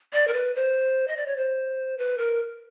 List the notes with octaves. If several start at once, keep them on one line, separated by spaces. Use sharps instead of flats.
D5
A#4
B4
C5
D#5
D5
C#5
C5
B4
A#4